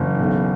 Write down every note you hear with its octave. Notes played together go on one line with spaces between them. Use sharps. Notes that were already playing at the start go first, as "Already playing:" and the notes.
Already playing: F#1 E3
B1